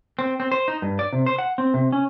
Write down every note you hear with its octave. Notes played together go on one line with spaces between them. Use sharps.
C4
C4
C5
D#4
G2
D5
C3
C5
F#5
C4
C3
C#4